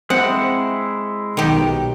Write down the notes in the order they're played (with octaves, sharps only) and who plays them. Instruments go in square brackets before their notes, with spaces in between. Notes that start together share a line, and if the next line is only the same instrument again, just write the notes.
[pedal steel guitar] G#3 E4 [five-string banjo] C4 [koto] F#5
[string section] B1 [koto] D#3 G4